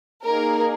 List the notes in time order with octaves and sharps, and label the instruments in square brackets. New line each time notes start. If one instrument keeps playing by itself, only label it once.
[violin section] A#3 D#4 G#4 A#4